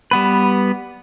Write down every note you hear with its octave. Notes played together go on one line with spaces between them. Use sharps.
G3 B3 B4